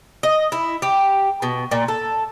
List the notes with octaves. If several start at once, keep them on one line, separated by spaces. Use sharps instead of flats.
D#5
E4
G4
B2
A#2
A4